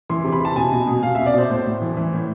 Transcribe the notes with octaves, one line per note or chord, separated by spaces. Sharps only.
E3 C6
C3
B5
C3 A5
B2 G#5
B2
B2
B2 F5
B2 E5
D5
B2 C5
A2 C5
A2
E3
E3
A2